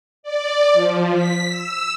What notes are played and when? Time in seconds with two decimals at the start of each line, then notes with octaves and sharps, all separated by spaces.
0.23 D5
0.73 F3
1.15 B6
1.48 E6